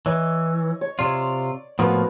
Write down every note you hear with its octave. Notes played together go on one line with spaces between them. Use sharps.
E3 C#5 D#5
C#5
C3 F4 D5
A2 F3 A#3 B3 F#4 E6